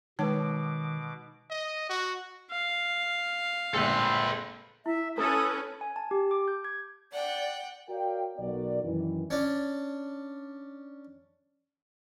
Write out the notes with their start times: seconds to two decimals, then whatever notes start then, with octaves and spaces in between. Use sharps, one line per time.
0.19 B2 D#3 G#3 D#4 B4 C#5 A5 D6
1.50 D#5
1.89 F#4
2.51 F5
3.74 G1 A#2 G#3 C4 A4 B4
4.86 E4 E5
5.18 C#4 A4 B4 A#5 D#6
5.81 G#5
5.96 A5
6.11 G4
6.31 D6
6.48 G6
6.65 G#6
7.13 D5 F#5 G5
7.89 F#4 A#4 C#5 D5 F5 G5
8.38 B1 B3 F#4 A#4 D5
8.84 F#2 D#3 E3
9.30 C#4 D4